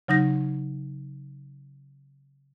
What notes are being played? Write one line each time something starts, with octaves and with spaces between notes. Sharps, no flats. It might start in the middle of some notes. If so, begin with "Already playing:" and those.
C#3 F#3 D#4 G6 A#6